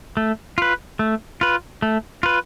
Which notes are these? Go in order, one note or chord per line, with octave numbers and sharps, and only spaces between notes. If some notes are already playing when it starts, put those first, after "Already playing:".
A3
F4 B4
A3
F4 B4
A3
F4 B4